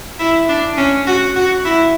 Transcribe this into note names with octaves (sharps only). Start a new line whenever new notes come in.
E4
D4
C#4
F#4
F#4
E4